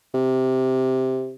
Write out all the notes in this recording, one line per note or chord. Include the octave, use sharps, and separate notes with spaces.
C3